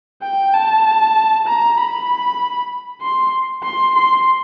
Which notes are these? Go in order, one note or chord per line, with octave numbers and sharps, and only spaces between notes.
G5
A5
A#5
B5
C6
C6
C6